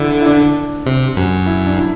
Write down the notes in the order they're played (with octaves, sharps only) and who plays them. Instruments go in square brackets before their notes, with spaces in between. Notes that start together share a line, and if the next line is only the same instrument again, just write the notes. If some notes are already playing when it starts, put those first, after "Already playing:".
Already playing: [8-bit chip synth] D3 [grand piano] D4 E4
[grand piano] E4
D4
[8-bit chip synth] C3
F#2
[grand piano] E4
D4
E4